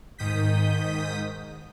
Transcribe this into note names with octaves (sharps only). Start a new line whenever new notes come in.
G#2 D#3 D#6 G6 B6